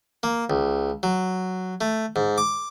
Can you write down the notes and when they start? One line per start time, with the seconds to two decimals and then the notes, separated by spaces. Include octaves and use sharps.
0.23 A#3
0.50 C#2
1.03 F#3
1.81 A3
2.16 G#2
2.38 D6